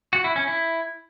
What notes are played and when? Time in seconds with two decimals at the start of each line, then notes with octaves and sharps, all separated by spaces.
0.13 F#4
0.24 E4
0.36 C#4
0.47 E4